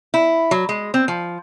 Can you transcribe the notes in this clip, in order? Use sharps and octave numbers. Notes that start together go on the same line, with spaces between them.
E4
F#3
G#3
C4
F3